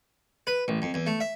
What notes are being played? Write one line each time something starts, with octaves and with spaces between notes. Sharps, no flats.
B4
A1
F2
E2
A3
E5